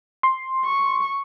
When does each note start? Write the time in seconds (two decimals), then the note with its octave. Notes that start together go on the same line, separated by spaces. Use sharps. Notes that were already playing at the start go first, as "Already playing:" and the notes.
0.23 C6
0.65 C#6